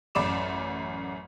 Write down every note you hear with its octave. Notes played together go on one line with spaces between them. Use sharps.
A1 F#2 D5 B5 D6 E7